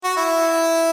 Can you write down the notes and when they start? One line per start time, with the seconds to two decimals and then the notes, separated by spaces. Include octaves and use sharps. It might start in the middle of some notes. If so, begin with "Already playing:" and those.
0.04 F#4
0.17 E4